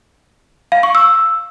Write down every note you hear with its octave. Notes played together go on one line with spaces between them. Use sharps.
F5
C#6
E6